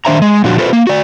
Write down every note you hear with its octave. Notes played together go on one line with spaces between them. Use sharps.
D#3 D4 C5 E5 A#5
G#3
A#2 F3 D4 F#4
F4 A4 B4 C5
A#3
F#4 D5